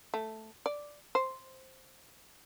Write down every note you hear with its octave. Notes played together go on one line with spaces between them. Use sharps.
A3
D5
C5